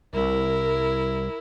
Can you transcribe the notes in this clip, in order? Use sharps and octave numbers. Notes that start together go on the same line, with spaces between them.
C2 E4 A#4